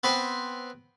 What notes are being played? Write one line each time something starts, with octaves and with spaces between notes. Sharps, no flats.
B3 C4 B4 C5 G5